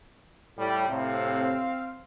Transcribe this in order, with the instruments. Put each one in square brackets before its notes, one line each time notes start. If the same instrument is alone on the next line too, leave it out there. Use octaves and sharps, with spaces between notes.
[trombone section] A2 G3
[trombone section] A2 C3 [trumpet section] C4 F5